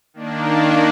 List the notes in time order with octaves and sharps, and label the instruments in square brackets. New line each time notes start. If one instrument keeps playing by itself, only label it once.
[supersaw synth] D#3 A#3 D4